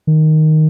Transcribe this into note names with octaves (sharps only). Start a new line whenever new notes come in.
D#3